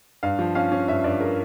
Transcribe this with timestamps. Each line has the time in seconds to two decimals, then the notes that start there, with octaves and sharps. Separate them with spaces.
0.23 G2 F5
0.39 F3
0.55 C#4 F5
0.72 C#4
0.88 G2 E5
1.04 G2 D5
1.21 A#4